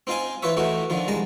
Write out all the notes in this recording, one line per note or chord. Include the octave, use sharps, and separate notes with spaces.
C4 D#4 F4 F5 G#5
E3 F4 B4 C#5 E5
A2 E3 A3 D#4 F#4
D3 D#3 F3 D#4
C2 G#3 A5 A#5